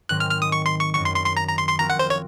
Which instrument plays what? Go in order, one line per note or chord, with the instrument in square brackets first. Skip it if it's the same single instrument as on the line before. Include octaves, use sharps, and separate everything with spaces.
[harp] G#2 D#3 F#3 C4 [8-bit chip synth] F#6
[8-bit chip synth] F6
F6
D#6
C#6
C6
C#6
[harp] F#2 D#3 F#3 [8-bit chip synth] C#6
[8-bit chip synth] C6
C6
C6
A#5
A#5
C6
C6
[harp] F3 C4 F#4 A#4 [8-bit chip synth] A#5
[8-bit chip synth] F#5
C5
C#5